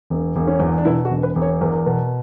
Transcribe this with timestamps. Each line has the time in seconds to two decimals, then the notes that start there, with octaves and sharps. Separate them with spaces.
0.10 E1
0.36 E1
0.47 C#4
0.60 E2
0.78 D4
0.85 B2 E4
1.05 F#4
1.10 E1
1.23 B4
1.35 E1
1.42 C#5
1.61 E2 A#4
1.86 B2